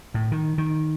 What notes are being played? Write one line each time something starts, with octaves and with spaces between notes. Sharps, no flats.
A2
D#3
D#3